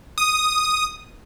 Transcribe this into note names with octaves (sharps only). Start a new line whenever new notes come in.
D#6